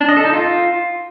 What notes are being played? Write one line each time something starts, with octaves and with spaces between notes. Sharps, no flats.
D4
D#5
A4
D#4
F4